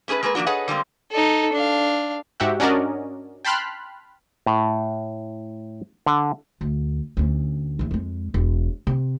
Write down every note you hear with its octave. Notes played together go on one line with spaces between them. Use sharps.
A3 C#4 G#4 A4 B4
G#3 A#3 G#4 A#4 B4
F3 A#3 B3 D4 F#4
G#4 A4 B4 C#5 D#5 F#5
D3 G3 G#3 A#3 C4
D#4 A4
D4 F5
G#2 F#4 G4 E5 F#5
C#4 D4 F#4 A#4 D5 D#5
G5 A5 B5 C6 F6 F#6
A2
D3
D2
D2 C#4
A#1 E2
F2 G#3
E1
C3